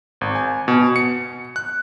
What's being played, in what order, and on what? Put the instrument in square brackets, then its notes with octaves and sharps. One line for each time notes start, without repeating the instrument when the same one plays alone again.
[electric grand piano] G#1
G#5
B2
C#7
F#6